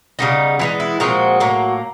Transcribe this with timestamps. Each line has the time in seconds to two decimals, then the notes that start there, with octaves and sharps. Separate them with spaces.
0.19 C#3 E3 G3 B3 D#4
0.59 E3 G#3 B3 E4
0.80 E4
1.00 A#2 F3 G#3 C4 F#4
1.40 A2 F#3 A#3